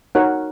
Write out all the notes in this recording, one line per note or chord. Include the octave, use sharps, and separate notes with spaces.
D#4 F#4 A#4 C#5 F#5